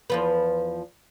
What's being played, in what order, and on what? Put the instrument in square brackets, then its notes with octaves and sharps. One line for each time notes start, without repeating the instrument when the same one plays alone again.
[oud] E2 F3 B4